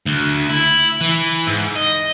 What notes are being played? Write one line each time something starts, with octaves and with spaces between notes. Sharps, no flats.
D2
E4
E3
G#2
D#5